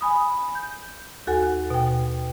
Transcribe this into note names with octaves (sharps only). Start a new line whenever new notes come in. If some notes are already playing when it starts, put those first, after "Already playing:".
G#5 B5 D#6
G6
D#2 F#4 A4 F#5 G#5
B2 G5